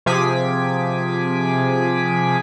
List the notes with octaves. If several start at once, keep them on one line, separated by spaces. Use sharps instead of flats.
C3 F3 G#4 G#5 D6 B6